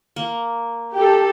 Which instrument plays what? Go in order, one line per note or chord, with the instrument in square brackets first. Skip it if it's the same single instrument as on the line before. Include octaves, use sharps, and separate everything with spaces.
[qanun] A#3
[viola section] G4 A4 [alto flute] G5